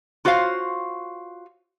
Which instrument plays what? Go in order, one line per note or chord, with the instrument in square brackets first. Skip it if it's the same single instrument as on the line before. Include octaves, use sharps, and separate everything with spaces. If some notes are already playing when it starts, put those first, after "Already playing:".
[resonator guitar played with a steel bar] F4 F#4 C5 C#5 F5